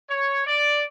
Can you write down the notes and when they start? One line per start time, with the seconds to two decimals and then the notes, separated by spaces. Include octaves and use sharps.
0.10 C#5
0.46 D5